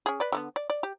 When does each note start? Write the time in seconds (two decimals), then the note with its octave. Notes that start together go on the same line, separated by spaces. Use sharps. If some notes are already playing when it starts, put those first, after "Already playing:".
0.06 C#4 G#4
0.20 B4 D5
0.32 D3 A#3 B3
0.56 D5
0.70 D5
0.83 G4